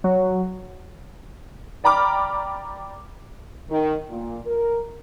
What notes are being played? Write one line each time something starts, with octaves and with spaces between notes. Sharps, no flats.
F#3
D5 G5 A#5 B5 D6 F6
D#3
A#2
A#4